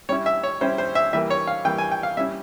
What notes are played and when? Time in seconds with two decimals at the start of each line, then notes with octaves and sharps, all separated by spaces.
0.09 G3 C#4 E4 C#5
0.26 E5
0.43 C#5
0.61 G3 C#4 E4 C5
0.78 C5
0.95 E5
1.13 E3 G3 A#3 E5
1.30 C#5
1.47 F5
1.65 E3 G3 A#3 G5
1.78 G#5
1.91 G5
2.03 F5
2.17 G3 C#4 E4 E5